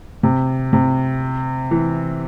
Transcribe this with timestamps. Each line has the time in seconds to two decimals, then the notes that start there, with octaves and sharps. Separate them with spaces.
0.23 C3
0.73 C3
1.71 E3